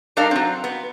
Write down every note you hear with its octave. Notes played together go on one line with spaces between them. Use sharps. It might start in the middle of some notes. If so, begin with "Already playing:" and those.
G3 D4 D#4 A4 A#4 F5
F#3 C4
B3